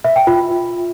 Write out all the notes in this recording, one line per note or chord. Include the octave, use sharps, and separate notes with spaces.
E5
G5
F4